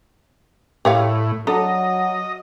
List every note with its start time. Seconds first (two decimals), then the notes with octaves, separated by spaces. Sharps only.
0.85 A2 G4 C#5 F5
1.47 F#3 D4 A4 D#5 A#5